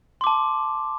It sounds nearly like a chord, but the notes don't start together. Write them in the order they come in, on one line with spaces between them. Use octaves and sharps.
C6 D6 A5